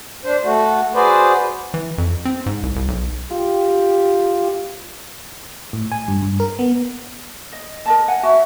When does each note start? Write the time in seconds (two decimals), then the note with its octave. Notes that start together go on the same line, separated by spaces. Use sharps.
0.25 D4 C5
0.44 A3 F#4
0.95 F#4 G#4 B4 C5 D5
1.74 E3
1.98 F2
2.25 C4
2.46 G#2
2.63 C2
2.76 C2
2.88 B1
3.31 F4 G4
5.73 A2
5.92 G#5
6.08 G2
6.22 G2
6.40 A#4
6.59 B3
7.53 D#5
7.86 A#4 D#5 A5
8.08 F#5 G#5
8.23 F#4 E5